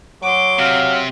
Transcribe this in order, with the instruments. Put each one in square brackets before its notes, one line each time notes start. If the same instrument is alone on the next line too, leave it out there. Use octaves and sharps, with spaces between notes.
[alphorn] F#3 [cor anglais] F#4 [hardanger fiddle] C6 D6
[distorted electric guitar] C3 [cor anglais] F5